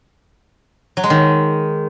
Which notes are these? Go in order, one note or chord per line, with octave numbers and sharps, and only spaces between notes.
F#3
G#3
D#3